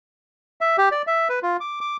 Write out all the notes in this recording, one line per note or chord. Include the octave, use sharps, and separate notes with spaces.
E5
G4
D5
E5
B4
F4
D6
D6